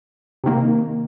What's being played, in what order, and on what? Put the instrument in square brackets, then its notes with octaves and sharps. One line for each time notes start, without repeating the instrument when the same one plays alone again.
[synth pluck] C3 D#3 A#3